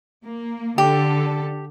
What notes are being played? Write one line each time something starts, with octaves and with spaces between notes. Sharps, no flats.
A#3
D3 G4 A4